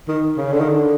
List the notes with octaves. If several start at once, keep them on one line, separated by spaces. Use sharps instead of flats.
D#3
C#3
D3
D#3
D3